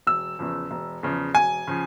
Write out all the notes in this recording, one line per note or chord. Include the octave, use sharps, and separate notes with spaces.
E1 E6
E2 C#3 F3
E1
E2 C#3 F3
E1 G#5
C#3 F3